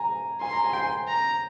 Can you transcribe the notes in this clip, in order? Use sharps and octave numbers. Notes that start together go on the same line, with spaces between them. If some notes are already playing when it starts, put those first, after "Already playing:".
Already playing: G#5 A#5
G#5 C6
A#5
G#5
G5
G#5
A#5